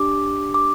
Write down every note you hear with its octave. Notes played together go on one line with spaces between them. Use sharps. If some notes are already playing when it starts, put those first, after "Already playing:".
Already playing: D4 G4 D6
D6